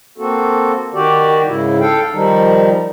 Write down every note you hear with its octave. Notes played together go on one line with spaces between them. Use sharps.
A#3 C4 F#4 A4
D#3 F#4 G4 D5
G#2 C#3 E4
A4 F5 G5
D#3 F3 G3 D#4